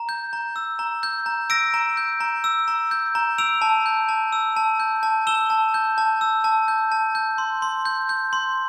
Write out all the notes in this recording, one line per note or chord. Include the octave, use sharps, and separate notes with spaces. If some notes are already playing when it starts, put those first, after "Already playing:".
Already playing: A#5
G6
A#5
E6
A#5
G6
A#5
E6 A#6 D7
A#5
G6
A#5
E6
A#5
G6
A#5
E6 D7 F7
A5
G6
A5
E6
A5
G6
A5
E6 E7 G7
A5
G6
A5
E6
A5
G6
A5
G6
C6
C6
G6
G6
C6